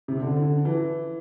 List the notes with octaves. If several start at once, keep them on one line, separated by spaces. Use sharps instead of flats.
C3
D3
D3
E3